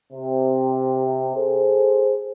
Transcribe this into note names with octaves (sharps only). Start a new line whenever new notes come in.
C3
G#4 A4 C5